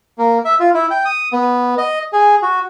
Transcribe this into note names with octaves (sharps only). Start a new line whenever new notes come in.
A#3
E5
F4
E4
G5
D#6
B3
D#5
G#4
F#4